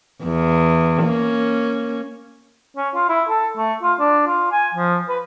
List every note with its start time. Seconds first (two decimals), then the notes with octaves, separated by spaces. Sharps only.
0.24 E2
1.04 A#3 C#4
2.77 C#4
2.94 F4
3.09 E4
3.29 A4
3.57 A3
3.82 F4
3.99 D4
4.27 F4
4.52 G#5
4.74 F3
5.08 B4